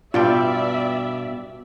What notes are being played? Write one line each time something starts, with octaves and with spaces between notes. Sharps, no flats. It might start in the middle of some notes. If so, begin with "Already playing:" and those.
G2 B2 G3 F4 D5 E5 G5